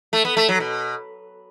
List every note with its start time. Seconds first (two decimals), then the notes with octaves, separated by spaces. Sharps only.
0.13 A3
0.25 B3
0.37 A3
0.48 F#3
0.60 B2